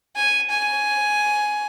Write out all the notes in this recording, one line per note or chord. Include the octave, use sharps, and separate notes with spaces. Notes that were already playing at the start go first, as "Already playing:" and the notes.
G#5
G#5